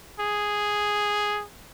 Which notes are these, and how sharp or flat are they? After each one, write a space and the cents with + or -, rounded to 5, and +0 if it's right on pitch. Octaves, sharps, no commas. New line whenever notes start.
G#4 +0